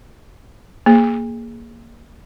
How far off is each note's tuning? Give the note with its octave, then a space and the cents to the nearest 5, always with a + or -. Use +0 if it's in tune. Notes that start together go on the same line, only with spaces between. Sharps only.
A#3 +0 G#4 +0